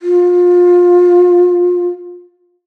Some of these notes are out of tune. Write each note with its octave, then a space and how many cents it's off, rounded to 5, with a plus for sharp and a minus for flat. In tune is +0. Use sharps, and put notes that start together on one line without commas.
F4 +25